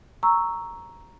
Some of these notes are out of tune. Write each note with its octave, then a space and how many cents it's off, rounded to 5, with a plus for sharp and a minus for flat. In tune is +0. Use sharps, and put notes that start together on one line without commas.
A#5 +0 C#6 +0 E6 +0